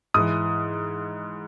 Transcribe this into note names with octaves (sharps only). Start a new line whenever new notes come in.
G#2 E3 D#6